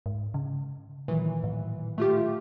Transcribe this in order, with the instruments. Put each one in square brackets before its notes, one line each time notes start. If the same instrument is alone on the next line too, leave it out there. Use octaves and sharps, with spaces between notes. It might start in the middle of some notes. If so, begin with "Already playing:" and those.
[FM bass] G#2
C#3
[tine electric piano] A#2 D#3 F#3 [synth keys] E3
[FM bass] A2
[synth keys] A3 F4 G4